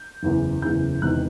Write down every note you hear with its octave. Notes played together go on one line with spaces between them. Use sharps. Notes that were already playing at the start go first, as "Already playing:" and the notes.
Already playing: G6
F#1 E2 C#3 E3
F#1 E2 C#3 E3 G6
E1 E2 C3 D#3 F#6